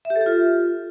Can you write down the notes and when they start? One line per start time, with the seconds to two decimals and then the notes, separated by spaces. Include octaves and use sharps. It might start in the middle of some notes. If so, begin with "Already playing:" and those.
0.05 E5
0.10 G4
0.16 A4
0.21 G4
0.26 F4